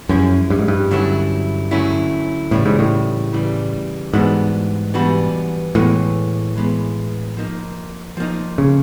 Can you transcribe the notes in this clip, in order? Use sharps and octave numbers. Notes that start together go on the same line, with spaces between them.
F#2 F3 G#3 C#4 E4 G#4
G2
G#2
G2
D3 F#3 A3 C#4 E4
D3 F#3 A3 C#4 E4
A2 C#3 E3 G3
G#2
A2
C#3 E3 G3
G#2 E3 G3 B3 D4 F#4
E3 G3 B3 D4 F#4
A2 E3 G#3 B3
E3 G#3 B3
F3 A#3 D#4
F3 A#3 D#4
C#3